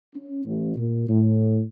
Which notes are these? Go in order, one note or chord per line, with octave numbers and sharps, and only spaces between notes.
C#4
A1
A#2
A2